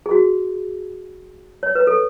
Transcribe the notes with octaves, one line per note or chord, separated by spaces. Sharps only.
G#4
F#4
C#5
B4
A4